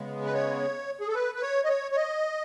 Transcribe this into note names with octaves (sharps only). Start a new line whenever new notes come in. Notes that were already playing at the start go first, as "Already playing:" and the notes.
Already playing: C#3 G#3 B3
B4
C#5
G#4
A4
B4
B4
C#5
D#5
C#5
C#5
D#5